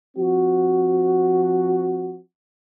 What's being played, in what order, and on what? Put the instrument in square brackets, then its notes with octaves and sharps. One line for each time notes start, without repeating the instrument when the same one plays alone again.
[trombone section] F3 C4 F#4